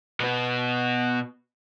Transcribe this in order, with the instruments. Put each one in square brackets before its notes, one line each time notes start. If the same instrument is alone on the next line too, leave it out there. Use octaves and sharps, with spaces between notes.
[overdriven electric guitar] B2 B3